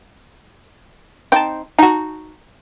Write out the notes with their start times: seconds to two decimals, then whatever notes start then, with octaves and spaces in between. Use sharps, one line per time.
1.32 C4 D#4 G5 A5
1.79 D#4 F#4 A5 A#5